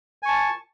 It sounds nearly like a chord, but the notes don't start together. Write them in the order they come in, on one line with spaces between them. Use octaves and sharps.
G#5 C#6 A5